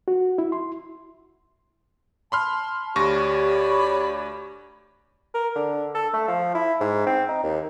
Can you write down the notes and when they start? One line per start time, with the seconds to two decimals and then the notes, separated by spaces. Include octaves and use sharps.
0.08 F#4
0.38 E4
0.52 C6
2.32 A5 B5 C6 F6
2.96 D2 G4 C#5 D5 B5 C#6 A#6
5.34 A#4
5.56 D3
5.95 A4
6.13 A3
6.28 F3
6.55 E4
6.80 G#2
7.07 C4
7.29 D#4
7.43 D#2